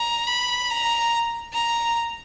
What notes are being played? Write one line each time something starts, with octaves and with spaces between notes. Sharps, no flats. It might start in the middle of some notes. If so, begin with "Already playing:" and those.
Already playing: A#5
B5
A#5
A#5